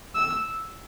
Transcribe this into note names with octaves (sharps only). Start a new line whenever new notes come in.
E6